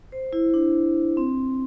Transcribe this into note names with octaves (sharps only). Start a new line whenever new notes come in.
C5
E4
D4
C4